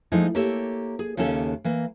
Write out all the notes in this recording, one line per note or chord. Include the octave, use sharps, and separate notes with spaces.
F3 G#3 A3 D#4 E4
A#3 G4 A4 C#5 E5
G#4
D#2 C#3 A#3 C#4 A4 E5
E3 A#3